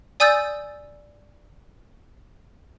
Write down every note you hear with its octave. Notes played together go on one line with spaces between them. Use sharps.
D5 G#5 D#6 E6 G6 A6